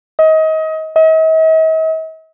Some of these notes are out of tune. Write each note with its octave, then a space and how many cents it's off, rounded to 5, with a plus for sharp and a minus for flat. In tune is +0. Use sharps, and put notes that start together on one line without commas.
D#5 +30
D#5 +45